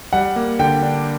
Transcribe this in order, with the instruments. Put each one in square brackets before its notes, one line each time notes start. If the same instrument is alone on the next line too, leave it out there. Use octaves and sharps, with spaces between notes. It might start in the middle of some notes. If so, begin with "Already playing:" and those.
[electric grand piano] G3 [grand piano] F#5
[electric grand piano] A#3
[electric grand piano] D3 [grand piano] G5
[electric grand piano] D4